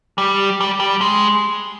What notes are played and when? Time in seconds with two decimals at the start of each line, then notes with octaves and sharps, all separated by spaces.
0.18 G3
0.61 G3
0.80 G3
1.01 G#3